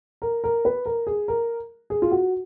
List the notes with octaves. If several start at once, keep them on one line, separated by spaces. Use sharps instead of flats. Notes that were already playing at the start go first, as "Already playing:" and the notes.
A#4
A#4
B4
A#4
G#4
A#4
G#4
F4
F#4